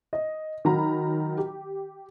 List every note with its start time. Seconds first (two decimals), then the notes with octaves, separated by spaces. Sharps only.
0.13 D#5
0.65 D#3 F#3 F#4 A#5 B5
1.38 G4